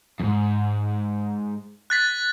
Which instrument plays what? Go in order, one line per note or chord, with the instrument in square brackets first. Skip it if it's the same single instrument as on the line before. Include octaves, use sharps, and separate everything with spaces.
[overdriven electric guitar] F2 G#2
[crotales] F#6 A6 B6